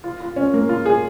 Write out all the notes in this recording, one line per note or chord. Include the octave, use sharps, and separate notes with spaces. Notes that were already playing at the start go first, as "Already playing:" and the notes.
F4
F4
C#4
A#3
F4
G#4